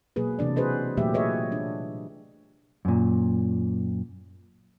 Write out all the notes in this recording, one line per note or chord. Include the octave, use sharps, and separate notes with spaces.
B2 F#3 A#3 G#4 B4
C3 E3 D4 D5
F#4 G#4 B4 C5 D#5
A#2 E3 F#3 A3 G4 E5
G#4 B4 C#5 D#5 E5
G3 D4
F#2 A#2